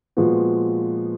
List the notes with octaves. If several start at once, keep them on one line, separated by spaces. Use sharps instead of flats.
A#2 F3 G#3 B3 F#4